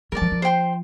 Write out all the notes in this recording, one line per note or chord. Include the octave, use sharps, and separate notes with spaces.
G3 A#4 D5 A5
F3
F3
C5 G5 C6